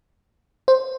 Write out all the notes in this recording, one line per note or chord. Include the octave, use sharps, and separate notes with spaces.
C5